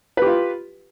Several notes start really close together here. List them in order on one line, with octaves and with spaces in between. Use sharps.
B4 G4 F4